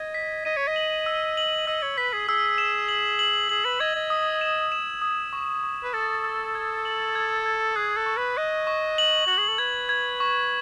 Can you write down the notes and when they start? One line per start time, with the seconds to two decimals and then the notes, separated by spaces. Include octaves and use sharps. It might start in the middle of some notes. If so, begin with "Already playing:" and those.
Already playing: D#5 G#6
0.14 B6
0.45 D#5 D#7
0.57 C#5
0.67 D#5
0.76 F#7
1.06 E6
1.37 F#7
1.67 D#5 E6
1.82 C#5
1.98 B4 B6
2.13 G#4
2.28 G#4 E6
2.58 E7
2.88 F#7
3.19 F#7
3.49 G#4 F#7
3.65 B4
3.80 D#5 G#6
3.96 D#5
4.10 D#6
4.41 E7
4.72 E7
5.02 D#6
5.33 C#6
5.63 C#6
5.83 B4
5.93 A4 A6
6.24 E6
6.55 G#6
6.85 F#7
7.15 G#6
7.46 G#6
7.76 G#4 F#6
7.97 A4
8.06 C#6
8.17 B4
8.37 D#5 F#6
8.67 C#6
8.98 F#7
9.27 F#4 F#7
9.38 G#4
9.48 A4
9.58 B4 G#6
9.89 G#6
10.20 C#6